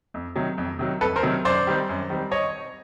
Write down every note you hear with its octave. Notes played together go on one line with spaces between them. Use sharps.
F2
C3 D#3 F#3
F2
C3 D#3 F#3
F2 A4 B4
A#4 C5
C3 D#3 F#3
F#2 C5 D5
D#3 G3 C4
F#2
D#3 G3 C4
C#5 D#5